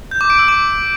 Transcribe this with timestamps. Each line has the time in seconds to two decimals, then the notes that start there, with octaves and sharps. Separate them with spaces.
0.11 G6
0.21 D6
0.30 D7
0.39 E6
0.48 D6